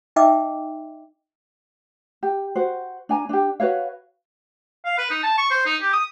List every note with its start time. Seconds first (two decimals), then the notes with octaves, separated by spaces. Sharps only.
0.16 D#4 D#5 E5 G5 D6 E6
2.23 G4
2.56 F#4 C5
3.09 D4 G#5 A#5
3.29 D4 G4
3.60 F#4 B4 C#5 F5
4.85 F5
4.98 B4
5.11 D#4
5.24 A5
5.38 C#6
5.51 C5
5.66 D#4
5.81 G4
5.93 D#6